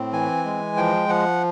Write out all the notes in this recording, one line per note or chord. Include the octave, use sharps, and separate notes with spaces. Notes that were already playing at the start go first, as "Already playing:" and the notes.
Already playing: A2 C4
E3 G#5
G#3
F3 G5
F3 F#5